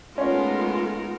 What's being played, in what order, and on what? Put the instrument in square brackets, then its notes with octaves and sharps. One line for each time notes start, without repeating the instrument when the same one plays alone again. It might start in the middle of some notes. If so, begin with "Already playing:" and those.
[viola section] G#3 A3 F4 [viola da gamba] B3 D#4 A#4 [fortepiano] C#4 C#5